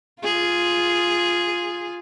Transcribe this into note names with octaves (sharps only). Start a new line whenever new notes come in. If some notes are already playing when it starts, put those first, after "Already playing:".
F4 G#4